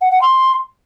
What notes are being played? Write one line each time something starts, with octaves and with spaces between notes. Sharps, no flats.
F#5
F#5
C6